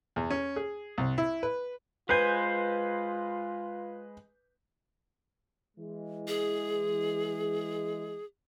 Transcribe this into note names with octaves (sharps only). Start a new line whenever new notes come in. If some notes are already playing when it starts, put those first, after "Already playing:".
E2
C#4
G#4
C2
E4
B4
G#3 F4 B4 C5 G#5 G6
E3 G#3
G#4